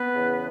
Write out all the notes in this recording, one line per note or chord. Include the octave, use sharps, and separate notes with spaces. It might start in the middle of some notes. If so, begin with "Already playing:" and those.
Already playing: B3 B4
E2 C#3 E3